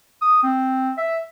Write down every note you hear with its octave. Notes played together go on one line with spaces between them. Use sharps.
D#6
C4
E5